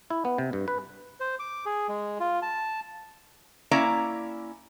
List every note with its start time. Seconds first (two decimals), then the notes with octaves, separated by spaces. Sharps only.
0.10 E4
0.25 B3
0.38 C3
0.53 G2
0.68 B4
1.20 C5
1.39 D6
1.66 G#4
1.88 G#3
2.20 F4
2.42 A5
3.71 A#3 C#4 E4 D5 A#5